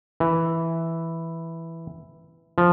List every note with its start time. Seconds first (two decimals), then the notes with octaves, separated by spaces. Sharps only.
0.20 E3
2.58 F3